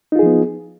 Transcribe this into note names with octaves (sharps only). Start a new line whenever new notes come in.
F3 B3 D#4 F4 G#4